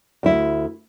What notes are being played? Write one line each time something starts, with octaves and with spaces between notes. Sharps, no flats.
D2 E4